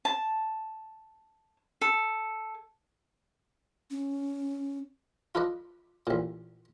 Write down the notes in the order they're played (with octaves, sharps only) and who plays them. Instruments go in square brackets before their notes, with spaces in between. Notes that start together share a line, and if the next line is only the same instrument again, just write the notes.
[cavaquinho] A5
A4
[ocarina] C#4
[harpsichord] F4 A4 B4 D5 D#5
A1 A#2